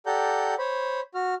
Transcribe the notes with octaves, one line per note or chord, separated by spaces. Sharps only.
G4 A4 D5 F#5 A#5 G6
C5 C#5 B5
F#4 F6